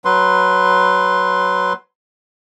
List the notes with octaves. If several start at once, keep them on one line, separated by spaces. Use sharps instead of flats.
F#3 B4 C6